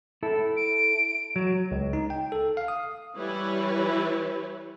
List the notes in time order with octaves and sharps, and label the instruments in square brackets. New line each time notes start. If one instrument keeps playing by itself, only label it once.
[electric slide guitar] E4 A4
[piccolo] D7
[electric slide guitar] F#3
[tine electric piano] C#2
D#4
G5
A4
F5
D#6
[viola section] E3 G3 E4 B4 C#5